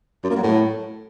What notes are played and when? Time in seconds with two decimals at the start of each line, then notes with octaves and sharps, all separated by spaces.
0.24 F#2
0.30 A#3
0.36 F#3
0.43 A2